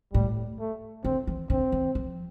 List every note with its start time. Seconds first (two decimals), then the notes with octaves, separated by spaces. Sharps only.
0.13 A2 G3
0.59 A3
1.05 D3 C4
1.27 E3
1.50 D3 C4
1.72 E3
1.95 F3